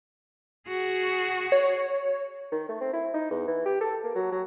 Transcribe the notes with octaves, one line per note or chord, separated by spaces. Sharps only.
F#4 G#4
C#5
D#3
A3
C4
E4
D#4
E2
E3
G4
A4
A#3
F#3
F#3